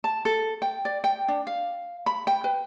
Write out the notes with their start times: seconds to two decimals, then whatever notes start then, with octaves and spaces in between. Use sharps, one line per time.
0.04 A5
0.25 A4
0.62 G5
0.85 D5
1.04 G5
1.28 D4
1.47 F5
2.06 B5
2.27 G5
2.44 B4